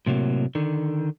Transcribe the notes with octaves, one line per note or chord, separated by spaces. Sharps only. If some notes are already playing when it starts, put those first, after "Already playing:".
A2 C3 F#3 A#3
D3 D#3